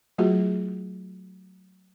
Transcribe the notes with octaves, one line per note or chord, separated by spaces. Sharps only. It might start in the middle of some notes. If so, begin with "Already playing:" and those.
F#3 A3 F4 F#4 G#4